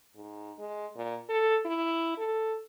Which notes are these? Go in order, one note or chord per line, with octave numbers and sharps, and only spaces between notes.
G#2
G#3
A#2
A4
E4
A4